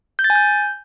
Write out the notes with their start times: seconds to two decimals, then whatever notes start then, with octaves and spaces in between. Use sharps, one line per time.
0.19 G6
0.24 A6
0.30 G#5
0.35 G6